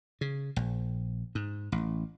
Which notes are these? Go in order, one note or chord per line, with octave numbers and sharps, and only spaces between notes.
C#3
A#1
G#2
A1